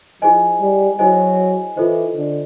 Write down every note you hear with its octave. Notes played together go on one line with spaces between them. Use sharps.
F3 E4 G#4 C5 D#5 G#5
G3
F#3 E4 G#4 C5 D#5 G#5
E3 F4 A4 C5 D#5
D3